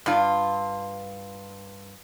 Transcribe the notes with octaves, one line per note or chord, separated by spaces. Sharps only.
G2 F4